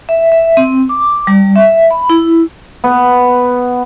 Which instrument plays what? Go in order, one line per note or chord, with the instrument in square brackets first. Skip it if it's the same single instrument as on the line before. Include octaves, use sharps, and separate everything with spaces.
[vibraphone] E5
E5
C4
D6
G3
E5
B5
E4
[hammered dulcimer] B3